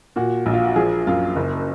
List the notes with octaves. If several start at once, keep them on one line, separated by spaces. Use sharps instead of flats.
A#2 F#4
A#1
F4
F#4
F3 G#4
F#2 F4
F#1